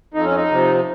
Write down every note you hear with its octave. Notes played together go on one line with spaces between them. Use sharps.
F2 D#4
C#4
D#4
C3 F3